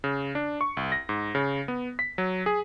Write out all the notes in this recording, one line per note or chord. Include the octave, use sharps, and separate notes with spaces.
C#3
D4
C#6
C2
A#6
G#2
C#3
B3
B6
F#3
G#4